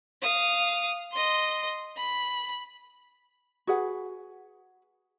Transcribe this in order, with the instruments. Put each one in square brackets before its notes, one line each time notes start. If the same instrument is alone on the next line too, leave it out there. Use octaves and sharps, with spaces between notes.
[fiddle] F5 D#6
D#5 C6
B5
[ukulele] F#4 G#4 B4 F#5